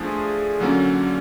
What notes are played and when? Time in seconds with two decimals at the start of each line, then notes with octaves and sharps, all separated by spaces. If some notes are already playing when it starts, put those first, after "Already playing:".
Already playing: F3 A3 D4 F4 G#4
0.60 D3 F#3 A#3 C#4